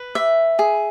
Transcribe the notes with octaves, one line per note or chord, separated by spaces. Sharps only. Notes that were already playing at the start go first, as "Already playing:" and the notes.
Already playing: B4
E5
G#4